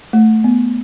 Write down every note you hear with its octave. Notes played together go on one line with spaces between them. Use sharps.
A3
B3